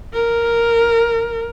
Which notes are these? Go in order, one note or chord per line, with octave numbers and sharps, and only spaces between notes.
A#4